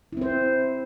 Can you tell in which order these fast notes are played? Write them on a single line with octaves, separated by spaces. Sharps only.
E4 C4 C5